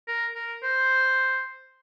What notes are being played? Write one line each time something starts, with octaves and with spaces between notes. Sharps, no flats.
A#4
A#4
C5